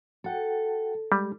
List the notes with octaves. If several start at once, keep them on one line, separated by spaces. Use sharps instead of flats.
F#4 A4 F#5 G5
G3 G#3 G4